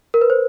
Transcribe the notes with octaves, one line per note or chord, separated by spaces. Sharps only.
A#4
B4
C5